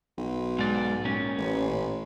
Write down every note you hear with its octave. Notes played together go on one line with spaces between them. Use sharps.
B1
G#2 D5
A#2 C#4
A1